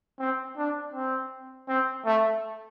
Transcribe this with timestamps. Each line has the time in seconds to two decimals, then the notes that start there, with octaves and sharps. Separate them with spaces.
0.19 C4
0.57 D4
0.94 C4
1.68 C4
2.05 A3